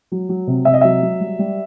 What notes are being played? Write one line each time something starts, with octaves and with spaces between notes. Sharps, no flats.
F#3
F#3
C3
C3 E5
D#5
F#3 E5
F#3
G3
G3